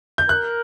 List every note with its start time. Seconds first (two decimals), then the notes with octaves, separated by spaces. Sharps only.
0.18 G6
0.29 A#4 F#6